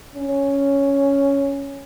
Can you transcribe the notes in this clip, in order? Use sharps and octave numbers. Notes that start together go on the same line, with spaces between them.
C#4